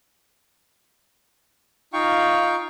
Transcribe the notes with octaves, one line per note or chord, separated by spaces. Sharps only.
D#4 F4 F5 G5 C#6